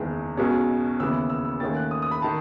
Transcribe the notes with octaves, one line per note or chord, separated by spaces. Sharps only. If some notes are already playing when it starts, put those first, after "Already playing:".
Already playing: F#1 E2 D#3 G#3
B1 B2 G#3 C#4
D#2 C#3 E3 B3 E6
E6
E6
D#2 D#3 A3 C#4 A6
F#6
D#6
D#6
B5
D#3 A5